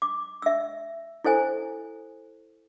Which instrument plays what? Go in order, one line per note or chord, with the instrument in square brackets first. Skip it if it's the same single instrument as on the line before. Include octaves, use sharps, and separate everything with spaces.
[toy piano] D6
E5 E6
E4 A4 C5 G#5